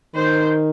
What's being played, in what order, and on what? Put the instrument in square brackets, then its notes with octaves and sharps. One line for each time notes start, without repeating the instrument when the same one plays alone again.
[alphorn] D#3 [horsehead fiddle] C5